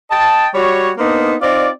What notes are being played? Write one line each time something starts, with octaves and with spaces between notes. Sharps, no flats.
D#5 G5 A5
G3 F#4 C#5
A#3 B3 D4 D#4 C5
C4 D#4 F4 D5